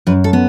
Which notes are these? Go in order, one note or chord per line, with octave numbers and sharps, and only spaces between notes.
F#2 B4
A4
B3